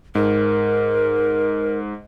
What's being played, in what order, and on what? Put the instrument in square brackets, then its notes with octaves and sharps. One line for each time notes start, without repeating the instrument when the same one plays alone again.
[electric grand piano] G#2 [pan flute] A#4